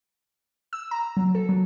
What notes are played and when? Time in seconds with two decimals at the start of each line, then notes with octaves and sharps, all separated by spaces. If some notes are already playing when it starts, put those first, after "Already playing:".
0.73 E6
0.91 A#5
1.17 F#3
1.35 A4
1.49 F#3